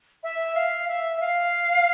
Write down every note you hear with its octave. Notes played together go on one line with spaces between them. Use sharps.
E5
F5
E5
F5